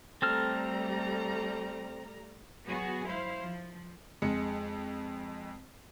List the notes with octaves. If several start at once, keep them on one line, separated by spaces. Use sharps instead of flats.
G3 A3 C4 A4 A#5 F6
F#3 B3 F#4 G#4
E4 C5 F5
F3
F2 G#3 C#7